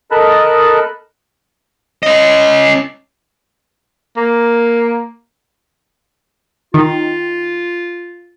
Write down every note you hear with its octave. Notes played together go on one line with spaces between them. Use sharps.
A4 A#4 D#5 A5 B5 F#6
C#4 D#5
A#3
D#3 F4